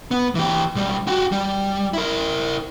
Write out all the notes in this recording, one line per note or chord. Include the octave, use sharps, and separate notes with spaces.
B3
E3 G4
B1 G3
F#4 G4
G3
E4 A#4